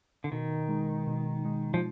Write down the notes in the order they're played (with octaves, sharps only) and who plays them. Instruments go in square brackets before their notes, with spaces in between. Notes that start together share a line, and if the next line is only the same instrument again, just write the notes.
[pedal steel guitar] D3
[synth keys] B2 [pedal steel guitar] D#3
[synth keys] G#3 D#4
B2
G#3 D#4
[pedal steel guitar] F3